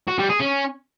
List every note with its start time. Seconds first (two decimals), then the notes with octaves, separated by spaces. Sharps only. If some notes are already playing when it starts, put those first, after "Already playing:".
0.08 F#4
0.19 G3
0.29 G#4
0.40 C#4